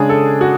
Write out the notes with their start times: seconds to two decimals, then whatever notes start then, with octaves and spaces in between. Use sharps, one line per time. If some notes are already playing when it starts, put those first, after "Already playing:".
Already playing: C#3 G#3 D4 G#4
0.09 A4
0.41 F#4